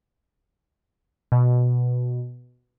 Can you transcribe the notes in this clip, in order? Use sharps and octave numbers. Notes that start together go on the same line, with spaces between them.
B2